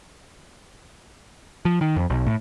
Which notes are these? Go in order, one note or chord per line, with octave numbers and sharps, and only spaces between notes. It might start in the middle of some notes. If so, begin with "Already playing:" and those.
F3
D#3
F2
B1
A2